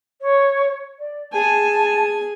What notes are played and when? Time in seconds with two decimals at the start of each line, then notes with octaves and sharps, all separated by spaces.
0.21 C#5
0.99 D5
1.32 G#4 G#5 A5